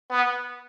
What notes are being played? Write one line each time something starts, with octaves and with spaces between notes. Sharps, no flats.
B3